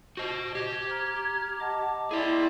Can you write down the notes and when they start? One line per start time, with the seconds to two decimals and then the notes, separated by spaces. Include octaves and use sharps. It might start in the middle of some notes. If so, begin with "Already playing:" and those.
0.17 F#4 C5 D#5
0.55 G4 G#6
0.90 A#5 F6
1.60 D#5 F#5 A5 D6
2.11 E4 G#4 D5 G#5 C6